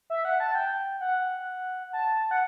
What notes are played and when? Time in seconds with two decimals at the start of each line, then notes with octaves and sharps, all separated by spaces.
0.10 E5
0.25 F#5
0.40 A5
0.55 G5
1.01 F#5
1.93 A5
2.31 F#5